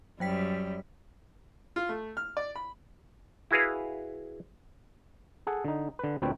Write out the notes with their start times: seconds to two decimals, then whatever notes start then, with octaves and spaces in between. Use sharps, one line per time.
0.20 F#2 F#3 G3 G5 B6
1.76 F4
1.89 A3
2.17 F6
2.37 D5
2.56 B5
3.51 E4 F#4 G#4 B4 F5
5.47 G#4 A4 F#5
5.65 D3 D#4
5.99 D3 B4
6.22 D2 A#2 C4 B4 C#5 G5